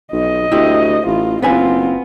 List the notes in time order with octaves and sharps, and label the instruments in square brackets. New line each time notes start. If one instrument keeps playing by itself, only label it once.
[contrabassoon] B1 [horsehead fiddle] D#5
[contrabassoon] D2 [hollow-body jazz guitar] E4 G4
[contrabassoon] A1 [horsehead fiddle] F4
[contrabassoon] F#1 [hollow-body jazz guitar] B3 B4 G#5 [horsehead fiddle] C4 F4